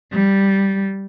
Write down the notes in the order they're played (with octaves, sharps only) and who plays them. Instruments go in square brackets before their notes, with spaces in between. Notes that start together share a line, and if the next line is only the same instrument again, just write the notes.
[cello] G3